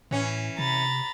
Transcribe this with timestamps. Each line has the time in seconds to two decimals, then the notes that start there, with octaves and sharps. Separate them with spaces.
0.11 A2 E3 C#4
0.59 C3 A#5 B5 A6